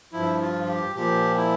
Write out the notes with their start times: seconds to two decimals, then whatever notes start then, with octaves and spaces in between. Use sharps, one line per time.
0.13 G2 F3 E4
0.41 F4
0.64 F4
0.68 G4
0.95 A#2 F3 G4
1.36 E4